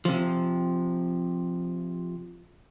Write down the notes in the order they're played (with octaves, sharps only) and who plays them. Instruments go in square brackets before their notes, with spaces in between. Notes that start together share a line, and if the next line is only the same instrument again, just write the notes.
[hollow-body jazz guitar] C3 F3